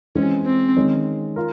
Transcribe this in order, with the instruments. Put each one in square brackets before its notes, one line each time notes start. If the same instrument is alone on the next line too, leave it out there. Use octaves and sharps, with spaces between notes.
[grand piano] E3 G#3 C4 F4 [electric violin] C#4
[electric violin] C4
[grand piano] D#3 G#3 C#4
F4 A#4